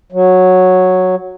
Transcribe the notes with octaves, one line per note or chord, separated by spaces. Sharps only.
F#3